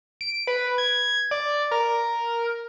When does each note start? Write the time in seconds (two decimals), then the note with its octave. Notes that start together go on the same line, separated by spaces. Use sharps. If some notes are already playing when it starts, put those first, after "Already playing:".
0.21 D7
0.47 B4
0.78 G#6
1.31 D5
1.71 A#4